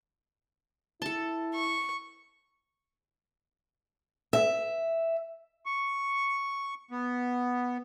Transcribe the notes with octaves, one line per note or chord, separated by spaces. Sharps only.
E4 A4 A5
C#6
E5
C#6
B3